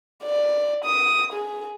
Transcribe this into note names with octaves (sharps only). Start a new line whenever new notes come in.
D5
D#6
G#4